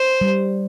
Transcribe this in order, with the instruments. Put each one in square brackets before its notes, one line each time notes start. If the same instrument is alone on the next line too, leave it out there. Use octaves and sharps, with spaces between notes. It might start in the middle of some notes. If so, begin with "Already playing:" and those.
Already playing: [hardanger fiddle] C5
[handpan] G3